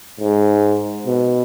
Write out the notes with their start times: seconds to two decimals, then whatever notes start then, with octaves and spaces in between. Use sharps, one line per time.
0.20 G#2
1.07 B2